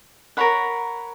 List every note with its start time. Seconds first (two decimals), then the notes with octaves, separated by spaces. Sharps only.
0.37 A#4 C#5 F#5 B5